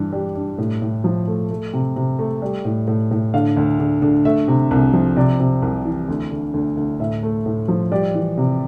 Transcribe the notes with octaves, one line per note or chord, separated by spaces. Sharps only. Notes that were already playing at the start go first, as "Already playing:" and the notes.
Already playing: G2 E3
G3
G2
A2
A2
F3
A3
A3
C3
C3
A3
G3
A2
A2
A2
D3 F5
D2
D3
D3
A3 E5
C3
C2
F3
C3 D5
C3
C2
E3
D2
D3
D2
D2
A2 E5
A3
A2
F3
G3 D5
E3
C3